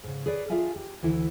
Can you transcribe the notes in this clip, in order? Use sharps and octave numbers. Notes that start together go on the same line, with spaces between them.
G#2 C#3
G#4 B4 C#5 D5
D4 F4 G#4 E5 F5 G#5
G4
D2 E3 E4